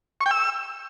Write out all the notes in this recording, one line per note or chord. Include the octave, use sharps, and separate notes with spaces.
C#6
G5
E6